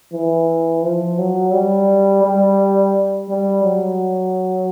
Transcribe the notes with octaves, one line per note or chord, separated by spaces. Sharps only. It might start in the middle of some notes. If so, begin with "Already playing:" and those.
E3
F3
F#3
G3
G3
G3
F#3